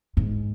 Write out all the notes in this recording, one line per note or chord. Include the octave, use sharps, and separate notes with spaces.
G#2